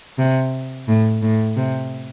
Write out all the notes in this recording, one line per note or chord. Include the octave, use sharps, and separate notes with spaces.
C3
A2
A2
C3